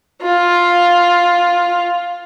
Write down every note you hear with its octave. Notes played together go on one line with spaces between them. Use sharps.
F4